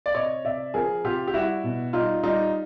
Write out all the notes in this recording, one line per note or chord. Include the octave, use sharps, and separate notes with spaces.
D5
C3 C#5 D#5
C3 D5 E5
F3 G#4 A#4
C3 F4 G4
G4
G3 E4 F#4
B2
G3 D#4 F4
G3 D#4 F4